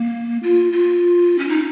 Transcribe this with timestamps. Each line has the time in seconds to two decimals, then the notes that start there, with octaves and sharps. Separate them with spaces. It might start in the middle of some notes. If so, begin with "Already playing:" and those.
Already playing: A#3
0.43 F4
0.72 F4
1.39 C#4
1.49 D#4